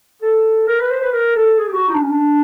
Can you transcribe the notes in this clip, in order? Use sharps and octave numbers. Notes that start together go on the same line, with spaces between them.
A4
A#4
B4
C5
B4
A#4
A4
G#4
G4
F#4
D#4
D4
C#4
D4